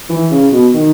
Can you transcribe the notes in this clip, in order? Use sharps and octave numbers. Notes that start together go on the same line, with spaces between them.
E3
C#3
B2
D#3